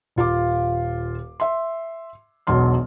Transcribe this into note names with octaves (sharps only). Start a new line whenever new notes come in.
D#1 F4 F5 D6
E5 C6
E1 B1 F#3 C6 F6